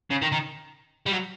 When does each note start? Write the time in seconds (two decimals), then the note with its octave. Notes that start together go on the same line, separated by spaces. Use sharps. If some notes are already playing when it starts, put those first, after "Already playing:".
0.10 C#3
0.22 D#3
0.32 D#3
1.06 G3
1.11 F#3